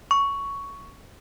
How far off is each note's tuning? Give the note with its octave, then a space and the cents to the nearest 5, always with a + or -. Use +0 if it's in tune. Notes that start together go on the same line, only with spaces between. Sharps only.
C#6 +10